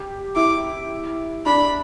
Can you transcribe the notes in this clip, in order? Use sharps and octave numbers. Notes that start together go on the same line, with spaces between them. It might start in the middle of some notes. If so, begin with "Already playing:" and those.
Already playing: G4
E4 D6
D4 B5